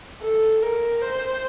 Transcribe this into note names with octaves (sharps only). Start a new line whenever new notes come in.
A4
A#4
C5